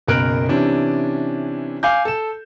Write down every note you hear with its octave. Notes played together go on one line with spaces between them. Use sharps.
F#1 B1 A#4 F#6 D7
C3 E3 C#4 D4
F5 G#5 D6 G6
A4 E7